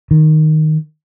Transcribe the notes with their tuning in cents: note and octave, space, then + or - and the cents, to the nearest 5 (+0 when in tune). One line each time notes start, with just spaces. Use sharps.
D#3 -5